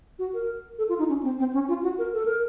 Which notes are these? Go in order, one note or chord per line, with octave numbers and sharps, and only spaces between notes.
F#4
A#4
A4
F4
D#4
C#4
C4
C4
C#4
F4
F#4
A#4
A4
A#4